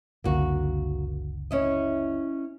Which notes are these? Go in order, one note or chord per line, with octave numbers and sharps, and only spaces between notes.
F#1 C#2 D3 A#3 F#4
C#4 E4 D#5